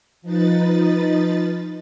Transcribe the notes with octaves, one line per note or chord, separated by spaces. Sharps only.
F3 D#4 B4 A6